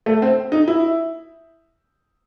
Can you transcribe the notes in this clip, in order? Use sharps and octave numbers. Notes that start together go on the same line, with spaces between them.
A3
C4
D#4
E4